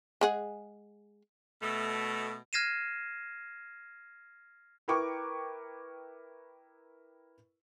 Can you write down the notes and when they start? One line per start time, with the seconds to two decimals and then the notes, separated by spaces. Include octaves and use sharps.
0.21 G#3 G#4 F#5
1.62 B2 A3
2.53 F6 G#6 A#6 C7 D#7 E7
4.88 E4 A#4 B4 G5 C#6 D6